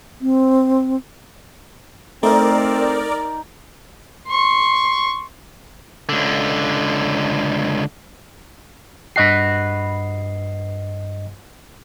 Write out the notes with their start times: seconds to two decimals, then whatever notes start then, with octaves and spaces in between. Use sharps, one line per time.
0.21 C4
2.23 A3 C4 D#4 A#4 D5
4.29 C6 C#6
6.09 C#2 D3
9.16 G2 F#4 B4 D#5 C7